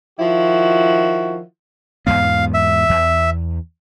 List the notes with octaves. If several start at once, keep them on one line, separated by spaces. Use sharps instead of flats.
D#3 F3 E4 F#4
E2 G#2 B3 F5
E5
E2